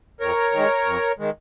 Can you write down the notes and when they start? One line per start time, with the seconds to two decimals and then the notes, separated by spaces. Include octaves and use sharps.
0.20 F2 A#4 C#5
0.52 D#3 G#3
0.86 F2
1.19 D#3 G#3